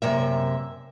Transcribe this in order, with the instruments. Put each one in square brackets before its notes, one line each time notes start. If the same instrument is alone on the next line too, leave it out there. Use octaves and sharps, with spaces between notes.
[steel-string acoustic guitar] F#2 C3 A#3 E5